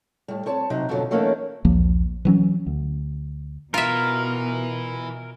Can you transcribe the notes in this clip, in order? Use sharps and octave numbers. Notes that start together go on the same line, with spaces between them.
A2 G3
C4 C#5 A5
C3 F#3 D#4
F2 G#2 B2 D3 D#3 F#3
E3 F#3 A3 A#3 C#4 D#4
A#1 D#2 F3 A#3
E3 F#3 C#4
D2
B2 E3 F4 A#4 E5